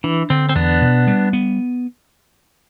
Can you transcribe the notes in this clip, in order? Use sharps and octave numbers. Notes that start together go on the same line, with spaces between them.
E3 D4
D3 C4
C4
E2 B3 D4
B2
G3
B3